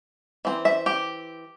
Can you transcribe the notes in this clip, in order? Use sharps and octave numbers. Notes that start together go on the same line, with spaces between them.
E3 C4
E5
G4